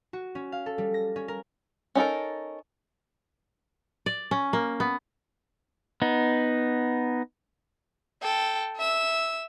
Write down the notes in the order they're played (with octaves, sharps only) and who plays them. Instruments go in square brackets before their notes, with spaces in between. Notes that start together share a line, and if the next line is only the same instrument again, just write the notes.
[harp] F#4
C#4
F5
A4
G3
A#6
C#4
A#4
[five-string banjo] C#4 D#4 A4 A#4
[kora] D5
C#4
A#3
B3
[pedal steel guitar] B3 D#4
[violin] A4 G5
E5 E6